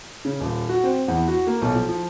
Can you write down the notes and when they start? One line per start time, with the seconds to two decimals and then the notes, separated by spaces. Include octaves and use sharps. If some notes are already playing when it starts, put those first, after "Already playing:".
0.25 C#3
0.40 D#1
0.69 F#4
0.84 C4
1.08 E2
1.28 F#4
1.47 A#3
1.62 B1
1.75 F3
1.89 F3